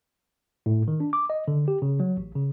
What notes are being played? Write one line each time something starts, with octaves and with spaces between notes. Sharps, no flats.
A2
D#3
D4
D6
D#5
D3
G4
C#3
F#3
A1
C#3